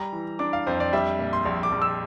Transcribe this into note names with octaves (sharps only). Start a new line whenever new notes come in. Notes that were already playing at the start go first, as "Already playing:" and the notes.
Already playing: G3 A#5
E3
D4 D6
F5
F2 C5
D5
G3 E5
A#2
C6
A#1
D6
A#1
E6